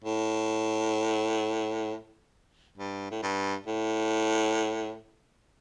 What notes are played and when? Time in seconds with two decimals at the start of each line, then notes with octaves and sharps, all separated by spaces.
0.04 A2
2.77 G2
3.11 A2
3.23 G2
3.67 A2